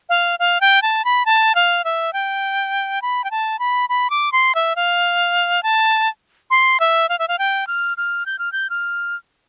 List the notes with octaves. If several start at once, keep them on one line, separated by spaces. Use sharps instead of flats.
F5
F5
G5
A5
B5
A5
F5
E5
G5
B5
G5
A5
B5
B5
D6
C6
E5
F5
A5
C6
E5
F5
E5
F5
G5
F6
F6
G6
F6
G6
F6